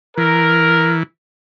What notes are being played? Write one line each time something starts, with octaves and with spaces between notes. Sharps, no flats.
E3 A#4